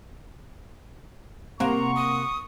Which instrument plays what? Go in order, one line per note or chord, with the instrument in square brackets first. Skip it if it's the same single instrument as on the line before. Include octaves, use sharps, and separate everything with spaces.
[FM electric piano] C3 F#5 C6 [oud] A#3 [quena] A#5 [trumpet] C#6
[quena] D#6